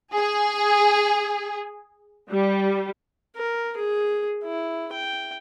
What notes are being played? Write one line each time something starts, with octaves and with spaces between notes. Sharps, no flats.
G#4
G3
A#4
G#4
E4
G5